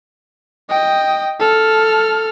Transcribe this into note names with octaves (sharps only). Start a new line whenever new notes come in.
D#5 G5
A4 F6